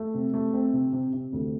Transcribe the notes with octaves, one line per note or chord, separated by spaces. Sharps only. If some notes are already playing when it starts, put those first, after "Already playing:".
Already playing: A3
C3
A3
C4
C3
C3
C3
D2